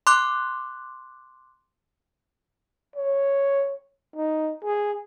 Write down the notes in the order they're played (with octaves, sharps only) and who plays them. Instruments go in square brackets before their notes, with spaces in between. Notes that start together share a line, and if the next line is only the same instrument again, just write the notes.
[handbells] C6 D6 F#6
[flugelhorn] C#5
D#4
G#4